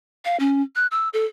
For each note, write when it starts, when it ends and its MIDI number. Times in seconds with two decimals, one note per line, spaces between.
0.25 0.37 77
0.40 0.62 61
0.76 0.87 90
0.91 1.09 88
1.13 1.26 69